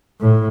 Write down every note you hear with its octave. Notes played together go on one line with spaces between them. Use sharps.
A2